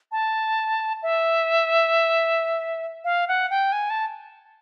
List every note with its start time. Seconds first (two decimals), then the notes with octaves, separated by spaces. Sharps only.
0.12 A5
1.03 E5
3.04 F5
3.28 F#5
3.50 G5
3.72 G#5
3.90 A5